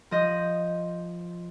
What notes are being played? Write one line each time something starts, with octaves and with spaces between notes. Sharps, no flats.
F3 D#5 G6